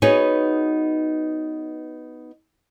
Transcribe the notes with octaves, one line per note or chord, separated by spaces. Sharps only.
B3 D#4 F#4 G#4 B4 C#5